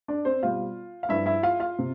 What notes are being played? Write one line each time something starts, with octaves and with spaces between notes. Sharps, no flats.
D4 D5
C4 C5
B2 G3 F4 F5
F5
G2 F3 E4 E5
E4 E5
F4 F5
F4 F5
C3